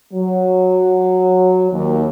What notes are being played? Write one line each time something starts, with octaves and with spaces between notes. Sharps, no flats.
F#3
D#2